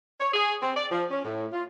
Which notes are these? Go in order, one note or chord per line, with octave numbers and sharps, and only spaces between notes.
C#5
G#4
C4
D5
F3
C#4
A2
F4